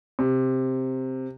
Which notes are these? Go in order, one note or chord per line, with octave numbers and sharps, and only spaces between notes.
C3